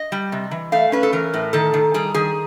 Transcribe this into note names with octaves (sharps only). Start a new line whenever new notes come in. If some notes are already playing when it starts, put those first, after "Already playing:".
Already playing: D#5
G3
C3
E3
A3 F5
C#4 B4
A4
E3 A#4
A2
D#3 A4
D#3
G3 G#4
D#3 G#4